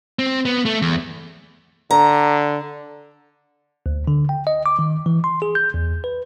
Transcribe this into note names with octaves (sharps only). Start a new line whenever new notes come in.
C4
B3
A3
E2
D3 A#5
D2
D3
G5
D#5
D6
D#3
E3
C6
G#4
G6
E2
B4